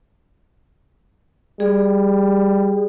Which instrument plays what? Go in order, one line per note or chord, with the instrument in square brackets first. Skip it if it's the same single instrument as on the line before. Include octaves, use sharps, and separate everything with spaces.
[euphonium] G3 [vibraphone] G#4